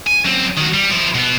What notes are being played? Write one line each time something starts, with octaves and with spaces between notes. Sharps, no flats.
G#5
F#2 C4
D#3 F#4
G3
F3 E4
B2 B3